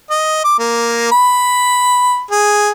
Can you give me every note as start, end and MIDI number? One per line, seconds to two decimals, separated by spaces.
0.11 0.40 75
0.44 0.54 86
0.59 1.09 58
1.11 2.21 83
2.31 2.70 68